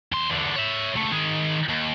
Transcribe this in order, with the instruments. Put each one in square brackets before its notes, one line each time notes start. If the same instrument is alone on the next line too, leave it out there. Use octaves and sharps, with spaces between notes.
[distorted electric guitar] E2 C6
E2 D3
C#5 E5
C#2 A3
D#3 G#4
D#2